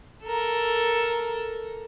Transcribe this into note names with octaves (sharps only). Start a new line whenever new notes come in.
A4 A#4